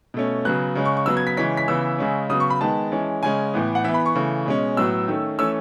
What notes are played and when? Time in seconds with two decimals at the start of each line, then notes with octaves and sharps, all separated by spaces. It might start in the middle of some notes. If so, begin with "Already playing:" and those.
0.14 B2 A3 C#4
0.45 C#3 F#3 B3 F#6
0.75 C#3 G#3 C#4
0.85 C#6
0.97 C#6
1.06 C#3 F#3 B3 E6
1.17 G#6
1.27 B6
1.37 C#3 E3 G#3 C#4 B6
1.57 B6
1.68 C#3 E3 B3 E6
1.99 C#3 G#3 C#4
2.29 C#3 F#3 B3 D#6
2.40 C#6
2.50 B5
2.61 D#3 G#3 B3 A5
2.92 E3 G#3 C#4
3.23 C#3 G#3 C#4 G#5
3.54 A2 E3 B3
3.75 F#5
3.84 E3 E5
3.88 B3
3.94 B5
4.06 C#6
4.15 C#3 E3 A3
4.46 B2 G#3 C#4
4.77 A2 F#3 B3 E6
5.08 D#3 A3 C#4
5.39 E3 A3 C#4 E6